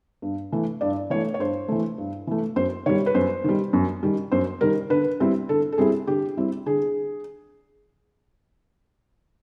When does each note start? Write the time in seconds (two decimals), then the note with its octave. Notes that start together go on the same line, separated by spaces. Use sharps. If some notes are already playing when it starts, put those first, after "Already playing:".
0.22 G2
0.52 E3 A3
0.81 G2 D5
1.10 E3 A3 C#5
1.34 C#5
1.39 G2 C5
1.68 E3 A3
1.98 G2
2.27 E3 A3
2.56 F#2 C5
2.86 D#3 G3 C#5
3.06 B4
3.15 F#2 C5
3.44 D#3 G3
3.73 F#2
4.03 D#3 G3
4.32 F#2 C5
4.61 D#3 G3 A#4
4.90 D3 B4
5.20 G3 C4 E4
5.49 D3 A4
5.72 A4
5.78 G3 C4 E4 G#4
6.07 D3 G4
6.37 G3 C4 E4
6.66 D3 G#4